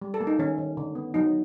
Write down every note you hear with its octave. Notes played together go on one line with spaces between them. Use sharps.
G3
A4
A#3
D#4
D#3 C#4
D#3
D3
B3
F#3 D#4